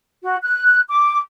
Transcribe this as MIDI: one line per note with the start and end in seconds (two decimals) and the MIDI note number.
0.22 0.36 66
0.42 0.80 90
0.88 1.18 86